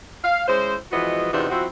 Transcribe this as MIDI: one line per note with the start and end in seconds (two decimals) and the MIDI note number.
0.23 0.45 77
0.47 0.74 56
0.47 0.74 61
0.47 0.74 64
0.47 0.74 72
0.91 1.29 52
0.91 1.29 53
0.91 1.29 56
0.91 1.29 59
0.91 1.29 66
0.91 1.29 75
1.32 1.46 40
1.32 1.46 48
1.32 1.46 59
1.32 1.46 62
1.32 1.46 63
1.32 1.46 65
1.50 1.65 53
1.50 1.65 60
1.50 1.65 64
1.50 1.65 66